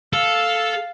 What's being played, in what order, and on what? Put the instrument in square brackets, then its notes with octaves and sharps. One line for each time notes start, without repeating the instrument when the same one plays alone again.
[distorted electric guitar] A4 [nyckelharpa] F5